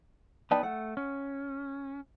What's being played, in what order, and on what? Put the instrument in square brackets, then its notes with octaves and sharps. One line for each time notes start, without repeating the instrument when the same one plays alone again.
[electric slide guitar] B3 D#4 B4 [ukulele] D5 G5 A5
[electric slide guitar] A3 [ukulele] F#5
[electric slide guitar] C#4